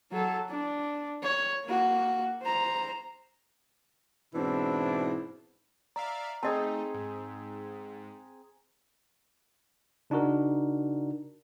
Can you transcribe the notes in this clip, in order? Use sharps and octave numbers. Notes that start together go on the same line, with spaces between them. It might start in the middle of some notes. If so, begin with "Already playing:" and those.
F#3 A4
D4
C#5
A#3 F#4
C5 A#5
G#2 B2 E3 C4 D4 E4
D5 E5 F5 A#5
A3 C4 D#4 G#4 D#5 A5
G#2
C#3 D4 D#4 F#4 A#4